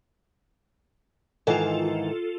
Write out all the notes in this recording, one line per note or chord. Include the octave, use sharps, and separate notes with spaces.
G#2 D#3 E3 F4 A4